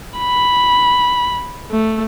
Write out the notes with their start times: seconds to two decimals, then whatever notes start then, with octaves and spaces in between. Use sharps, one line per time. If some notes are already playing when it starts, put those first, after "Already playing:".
0.18 B5
1.71 A3